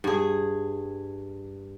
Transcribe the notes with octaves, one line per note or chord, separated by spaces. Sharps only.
G2 G#4